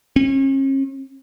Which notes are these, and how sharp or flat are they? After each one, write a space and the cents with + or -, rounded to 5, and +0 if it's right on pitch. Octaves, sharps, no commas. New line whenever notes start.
C#4 -40